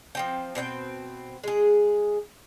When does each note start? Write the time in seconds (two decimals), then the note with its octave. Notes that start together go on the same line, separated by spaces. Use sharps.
0.15 F3 C4 G5
0.55 B2 C4 D#4 G5
1.44 G#3 G#4